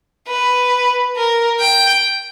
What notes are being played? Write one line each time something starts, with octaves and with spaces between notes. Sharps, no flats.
B4
A#4
G5